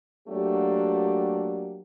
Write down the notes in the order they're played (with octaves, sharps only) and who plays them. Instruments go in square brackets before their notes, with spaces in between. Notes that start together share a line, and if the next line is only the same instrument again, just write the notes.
[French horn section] F#3 A3 A#3 D4 F#4 G4